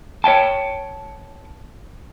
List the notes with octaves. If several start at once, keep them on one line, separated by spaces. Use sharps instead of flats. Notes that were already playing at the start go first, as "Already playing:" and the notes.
C#5 E5 G5 A5